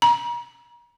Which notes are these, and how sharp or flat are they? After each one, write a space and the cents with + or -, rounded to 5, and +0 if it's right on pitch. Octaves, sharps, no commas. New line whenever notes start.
A#5 +35